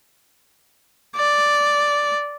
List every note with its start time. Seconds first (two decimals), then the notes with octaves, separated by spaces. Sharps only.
1.16 D5